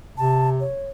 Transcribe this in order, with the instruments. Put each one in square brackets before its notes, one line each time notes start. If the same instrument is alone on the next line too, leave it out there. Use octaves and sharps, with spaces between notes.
[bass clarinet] C3 [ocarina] A5
[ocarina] C#5